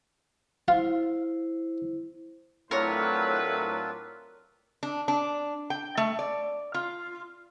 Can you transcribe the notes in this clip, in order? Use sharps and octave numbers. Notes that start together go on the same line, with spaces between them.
E4 F4 C5
A2 F#3 C4 D4 F4 A#4 B4 C#5
D4
D4
G5
A3
D5
F4